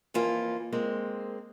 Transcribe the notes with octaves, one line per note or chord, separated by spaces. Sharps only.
F2 E3 A#3 F4
G#3 A#3 C4